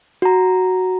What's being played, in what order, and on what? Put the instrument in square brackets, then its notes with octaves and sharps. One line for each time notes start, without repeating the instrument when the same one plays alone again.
[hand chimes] F#4 A#5